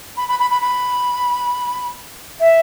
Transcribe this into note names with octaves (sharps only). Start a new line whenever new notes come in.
B5
B5
B5
B5
B5
E5